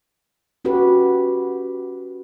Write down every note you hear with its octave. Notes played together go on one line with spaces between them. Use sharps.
C#4 F#4 G4 B4